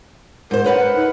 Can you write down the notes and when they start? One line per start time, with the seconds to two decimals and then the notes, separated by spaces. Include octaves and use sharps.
0.51 G#2 A#4 C5
0.64 A#4 B4 C#5 F#5
0.96 D#4